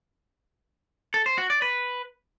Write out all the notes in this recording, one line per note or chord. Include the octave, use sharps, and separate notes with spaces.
A4
C5
F#4
D5
B4